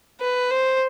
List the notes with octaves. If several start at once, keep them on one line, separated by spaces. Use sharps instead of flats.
B4
C5